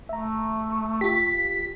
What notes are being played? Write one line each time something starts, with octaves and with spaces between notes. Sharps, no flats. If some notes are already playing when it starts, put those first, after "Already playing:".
A3 E5 A#5
F4 G4 B6